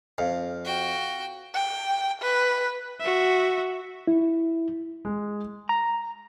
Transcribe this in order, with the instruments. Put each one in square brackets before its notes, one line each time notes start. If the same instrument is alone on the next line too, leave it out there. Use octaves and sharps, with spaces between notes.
[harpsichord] F2 [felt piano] F5
[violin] F#4 G5
[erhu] G5
B4
[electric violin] F#4 E5
[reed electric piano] E4
[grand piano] G#3
[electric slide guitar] A#5